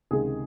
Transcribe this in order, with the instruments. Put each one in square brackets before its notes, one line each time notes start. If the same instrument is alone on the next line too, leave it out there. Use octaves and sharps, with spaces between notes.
[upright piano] C#2 C3 D#3 G#3 G#4